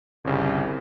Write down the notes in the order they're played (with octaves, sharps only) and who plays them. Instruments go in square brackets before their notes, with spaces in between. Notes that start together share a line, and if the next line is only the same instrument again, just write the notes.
[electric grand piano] G1 C#3 [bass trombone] C2